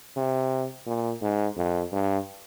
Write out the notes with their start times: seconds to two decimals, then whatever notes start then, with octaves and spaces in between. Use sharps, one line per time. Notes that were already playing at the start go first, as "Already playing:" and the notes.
0.16 C3
0.87 A#2
1.22 G#2
1.57 F2
1.92 G2